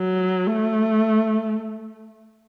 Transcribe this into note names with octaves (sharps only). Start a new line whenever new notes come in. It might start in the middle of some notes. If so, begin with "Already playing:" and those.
Already playing: F#3
A3